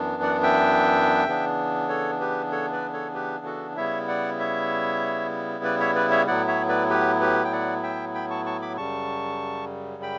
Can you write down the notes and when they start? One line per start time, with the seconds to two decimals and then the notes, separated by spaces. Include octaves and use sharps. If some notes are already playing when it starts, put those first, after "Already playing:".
Already playing: F#2 E3 B3 D4
0.22 D5 F#5
0.43 E5 G5
1.27 C#3 E3 B3 D4
1.89 A4 C#5
2.20 G4 B4
2.52 A4 C#5
2.72 B4 D5
2.93 A4 C#5
3.14 G4 B4
3.45 F#4 A4
3.77 C#3 G3 B3 E4 C#5 E5
4.08 D5 F#5
4.39 C#5 E5
5.64 B4 D5
5.80 C#5 E5
5.96 B4 D5
6.11 C#5 E5
6.27 A2 F#3 B3 E4 D5 F#5
6.47 C#5 E5
6.69 B4 D5
6.90 G4 B4
7.21 G4 B4
7.45 G5
7.52 D5 F#5
7.83 E5 G5
8.14 G5 B5
8.30 A5 C#6
8.46 A5 C#6
8.62 B5 D6
8.77 F#2 C#3 G3 A5 C#6
10.02 G5 B5